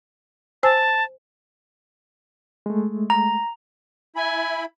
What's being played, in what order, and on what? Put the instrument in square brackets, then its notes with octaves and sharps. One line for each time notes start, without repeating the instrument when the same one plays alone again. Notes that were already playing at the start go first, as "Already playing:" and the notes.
[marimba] C5 G#5 E6 [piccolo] A5
[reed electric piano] G#3 A3
[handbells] A#5
[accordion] E4 B5 [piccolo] G#5